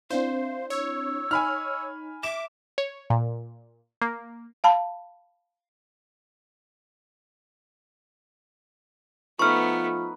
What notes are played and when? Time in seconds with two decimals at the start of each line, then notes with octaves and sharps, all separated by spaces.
0.10 C4 D4 E4 C5 F5
0.70 C#5 E6
1.31 D#4 G#5 B5 F6
2.23 E5 D6 E7
2.78 C#5
3.10 A#2
4.02 A#3
4.64 F5 A5 B5
9.39 F3 A3 B3 D#4 B4 C#6 F6